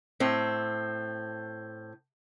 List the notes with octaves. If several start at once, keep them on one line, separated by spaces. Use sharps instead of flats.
A2 C4